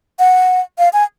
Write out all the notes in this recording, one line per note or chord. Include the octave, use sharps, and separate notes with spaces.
F#5
F5
G#5